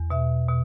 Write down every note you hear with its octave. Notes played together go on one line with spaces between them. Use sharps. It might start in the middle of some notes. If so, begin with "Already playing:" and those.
Already playing: E2
B2 E5
B2